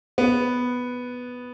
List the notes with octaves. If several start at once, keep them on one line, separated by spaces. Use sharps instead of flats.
B3